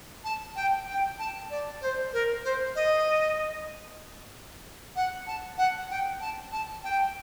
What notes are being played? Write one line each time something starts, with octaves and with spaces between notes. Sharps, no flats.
A5
G5
G5
A5
D5
C5
A#4
C5
D#5
F#5
A5
F#5
G5
A5
A5
G5